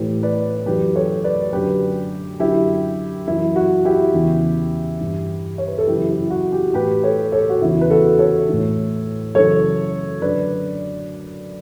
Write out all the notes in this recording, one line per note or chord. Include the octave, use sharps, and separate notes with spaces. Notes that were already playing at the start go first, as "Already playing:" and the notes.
Already playing: A2 E3 G4 B4
B4 D5
F#2 E3 G4 B4
A4 C#5
B4 D5
F#2 D3 G4 B4
F#2 D3 E4 G4
F#2 E3 E4
F#4
E4 G4
E2 C#3 E3
G2 E3
C#5
B4
A4
F#2 C#3 E3 E4 G4
E4
F#4
E4 G4
A2 E3 G4 B4
A4 C#5
A4 C#5
F#4
E2 C#3 E3 E4
B4
F#4 A4
A4 C#5
A2 E3
F#2 C#3 E3 A4 C#5
F#2 D3 B4 D5